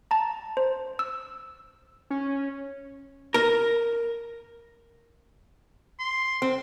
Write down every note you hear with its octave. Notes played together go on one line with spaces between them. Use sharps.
A5 A#5
C5
E6
C#4
A#4
C6
C4